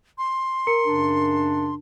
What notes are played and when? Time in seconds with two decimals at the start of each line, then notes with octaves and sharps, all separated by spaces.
0.18 C6
0.67 A#4 A#5 C#7
0.85 F#2 C#3 D4